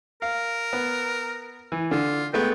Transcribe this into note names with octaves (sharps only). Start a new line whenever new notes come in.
A#4 F5
B3
E3
D3 F4
G#3 A3 B3 G5